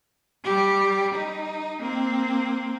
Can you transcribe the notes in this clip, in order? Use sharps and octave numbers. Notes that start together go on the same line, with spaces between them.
G3 G4
D#4
A#3 C4